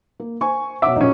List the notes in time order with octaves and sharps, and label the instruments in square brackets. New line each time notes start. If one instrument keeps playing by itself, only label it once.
[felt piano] A#3
C5 G#5 C#6
[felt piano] B2 C#5 F#5 [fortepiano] E5 D6
[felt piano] A#2 F#3 A#3 [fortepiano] C#4 D#4